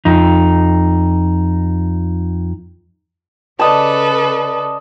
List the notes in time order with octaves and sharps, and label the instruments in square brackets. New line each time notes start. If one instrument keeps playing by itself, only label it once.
[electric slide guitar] F2 D#4
[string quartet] C#3 A4 B4 [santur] D5 D#5 A5